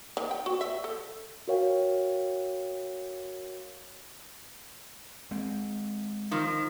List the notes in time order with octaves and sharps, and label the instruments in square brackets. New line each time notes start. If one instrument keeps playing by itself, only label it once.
[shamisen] D#3
G5
F#4
E5
A4
[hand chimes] F#4 A#4 C#5 F5 G5
[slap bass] G#3 C4
[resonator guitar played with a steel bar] D#3 F3